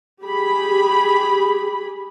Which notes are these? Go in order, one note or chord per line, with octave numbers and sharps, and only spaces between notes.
G4 G#4 B5